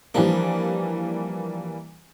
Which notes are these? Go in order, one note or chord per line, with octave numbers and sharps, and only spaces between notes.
E3 F3 G3 A#3 D4